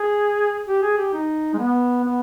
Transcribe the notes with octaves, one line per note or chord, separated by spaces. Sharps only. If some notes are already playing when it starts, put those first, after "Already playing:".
Already playing: G#4
G4
G#4
G4
D#4
G#3
B3
B3